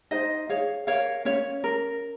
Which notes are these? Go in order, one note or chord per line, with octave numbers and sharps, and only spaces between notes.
D#4 C5 D#5
G#4 C#5 F5
A#4 C#5 F5
C#4 C#5
A#4